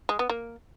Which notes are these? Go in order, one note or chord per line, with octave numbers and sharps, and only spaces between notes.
G#3
B3
A#3